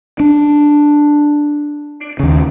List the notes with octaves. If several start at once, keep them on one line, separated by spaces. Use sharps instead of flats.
D4
D#2 C#3